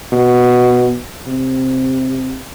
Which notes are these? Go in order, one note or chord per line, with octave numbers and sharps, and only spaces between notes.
B2
C3